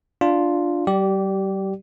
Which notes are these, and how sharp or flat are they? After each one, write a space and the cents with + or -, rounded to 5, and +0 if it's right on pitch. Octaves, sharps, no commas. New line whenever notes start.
D4 +0 F4 +0
G3 -35 G4 -20 D5 +0